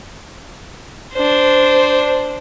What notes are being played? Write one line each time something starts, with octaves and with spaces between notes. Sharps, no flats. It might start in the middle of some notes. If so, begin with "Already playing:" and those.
D4 C5